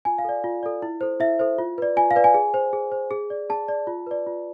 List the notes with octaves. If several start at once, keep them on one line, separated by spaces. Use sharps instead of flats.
F4 G#5
F5
A4 D5
F4
A4 D5
E4
A4 C5
E4 E5
A4 C5
F4
B4 D5
F4 G#5
F5
B4 D5
G#5
G#4
C5
G#4
C5
G#4
D5
G#4 A5
D5
F4
B4 D5
F4